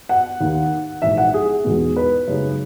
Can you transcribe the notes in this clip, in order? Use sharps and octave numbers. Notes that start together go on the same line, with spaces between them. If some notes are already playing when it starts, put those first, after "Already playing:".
F#5
D#2 D#3 A#3
A#1 G#2 E3 E5
F#5
G#4
E1 E2 B2 G#3 D#4
B4
F#2 C#3 G#3 D#4